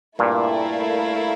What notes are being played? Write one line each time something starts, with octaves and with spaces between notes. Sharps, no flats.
G2 A#2 A3 E4 A#4 F5